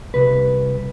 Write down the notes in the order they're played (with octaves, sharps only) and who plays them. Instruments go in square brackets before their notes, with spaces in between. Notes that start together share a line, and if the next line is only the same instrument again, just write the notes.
[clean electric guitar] C2 B4